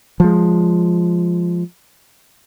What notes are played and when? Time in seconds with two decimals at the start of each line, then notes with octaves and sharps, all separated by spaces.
0.20 F3 G#3